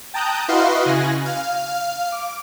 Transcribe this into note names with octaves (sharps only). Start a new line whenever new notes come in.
G5 A5 A#5 D#6 F#6 G6
E4 F#4 B4 D#5 F5 C6
C#3 G#5 F#6 A#6
F5
F5
D6